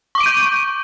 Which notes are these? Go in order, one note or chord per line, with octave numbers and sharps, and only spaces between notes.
C#6 D6 G6 D7 D#7